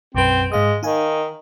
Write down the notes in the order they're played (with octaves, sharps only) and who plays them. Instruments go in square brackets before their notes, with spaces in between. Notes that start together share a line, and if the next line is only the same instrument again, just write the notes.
[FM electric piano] B1 F#2 B4 [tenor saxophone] C4
[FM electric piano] G#2 F5 D#6 [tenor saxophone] G#3
[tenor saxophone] D#3 [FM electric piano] D#4 F5 G#5